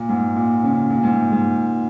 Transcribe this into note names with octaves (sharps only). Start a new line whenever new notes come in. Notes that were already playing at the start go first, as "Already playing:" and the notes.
Already playing: A#2
G#2
A#2
C#3
A#2
G#2
G#2